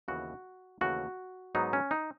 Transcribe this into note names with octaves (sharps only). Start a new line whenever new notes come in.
D#2 C#3 E3 B3 F#4
D#2 C#3 E3 A3 C#4 F#4
G#2 F#3 B3 D#4
C#4
D#4